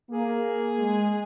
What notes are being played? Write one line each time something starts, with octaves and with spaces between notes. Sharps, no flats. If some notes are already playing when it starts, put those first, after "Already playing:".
A#3 G#4
G#3